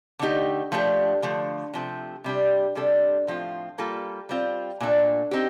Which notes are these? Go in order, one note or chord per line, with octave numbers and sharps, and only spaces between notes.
D3 A3 D#4 G4
F3 A3 D4 G4
D3 F3 A3
C3 F3 A3
C3 G3 D4 G4
C3 G3 D4 A4
A2 F3 C4 F4
G3 A#3 F4 A4
G3 C4 F4
A#2 A3 D4 A4
C4 D#4 G4